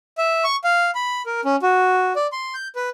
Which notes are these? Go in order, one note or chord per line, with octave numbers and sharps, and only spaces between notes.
E5
C#6
F5
B5
A#4
C#4
F#4
D5
C6
G6
B4